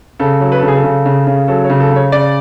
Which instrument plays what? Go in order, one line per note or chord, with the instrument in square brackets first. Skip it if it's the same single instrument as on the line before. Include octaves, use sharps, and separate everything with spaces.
[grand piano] C#3 A4
F#3
B4
A4
C#3
G#4
A4
C#3
C#3
C#3
F#3 A4
C#5
C#3
A4
C#3
C#5
C#3 D5